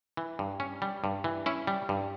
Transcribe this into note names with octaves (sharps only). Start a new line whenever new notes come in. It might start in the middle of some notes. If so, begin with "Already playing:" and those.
E3
G2
C#4
G3
G2
E3
C#4 E4
G3
G2